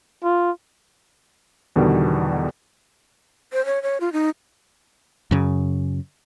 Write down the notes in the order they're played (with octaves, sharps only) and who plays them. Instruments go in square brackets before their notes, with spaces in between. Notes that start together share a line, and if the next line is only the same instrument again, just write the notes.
[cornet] F4
[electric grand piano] E2 B2 D3 D#3 G3
[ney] C5
C#5
C#5
F4
D#4
[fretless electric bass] F#2 C#3